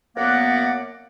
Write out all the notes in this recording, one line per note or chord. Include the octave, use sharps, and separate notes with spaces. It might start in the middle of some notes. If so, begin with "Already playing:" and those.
F#2 A#3 B3 D5 F#5